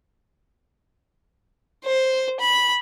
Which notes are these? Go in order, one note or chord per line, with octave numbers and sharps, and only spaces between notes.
C5
B5